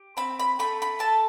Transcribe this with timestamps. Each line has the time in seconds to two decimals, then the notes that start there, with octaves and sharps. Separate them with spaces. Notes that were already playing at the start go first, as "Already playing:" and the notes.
Already playing: G4
0.17 C4 B5
0.39 B5
0.59 A3 B5
0.82 B5
0.99 A4 A5